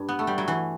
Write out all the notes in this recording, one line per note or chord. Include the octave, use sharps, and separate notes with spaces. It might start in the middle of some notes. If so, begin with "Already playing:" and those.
Already playing: G2
B3
A3
G3
F#3
E3